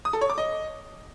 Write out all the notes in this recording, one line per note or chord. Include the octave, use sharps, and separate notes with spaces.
D#6
A4
C#5
D6
D#5